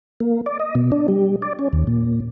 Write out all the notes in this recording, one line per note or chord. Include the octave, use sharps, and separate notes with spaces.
A#3
D5
D#5
B2
D4
G3
D5
C#4
D#2
A#2